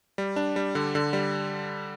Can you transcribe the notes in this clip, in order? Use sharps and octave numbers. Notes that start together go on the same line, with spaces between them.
G3
D4
G3
D3
D3
G3